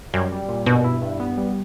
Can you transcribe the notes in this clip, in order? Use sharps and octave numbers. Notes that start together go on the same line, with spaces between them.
F#2 G3
G3
A#2
G2 B2
E4
G2
B3
G3